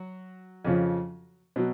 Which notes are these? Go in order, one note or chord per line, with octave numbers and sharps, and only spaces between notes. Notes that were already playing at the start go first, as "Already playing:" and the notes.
Already playing: F#3 F#4
F2 C#3 F3
B2 F#3